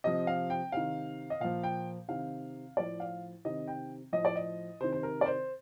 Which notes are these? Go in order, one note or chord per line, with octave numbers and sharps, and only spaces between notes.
C3 F3 D#5
F5
G5
C3 D#3 F5
D#5
A#2 F3 F5
G5
C3 D#3 F5
A2 F3 D5
F5
C3 D#3 D#5
G5
A2 F3 D#5
D5
D#5
C3 D#3 C5
C5
A#4
D5
C5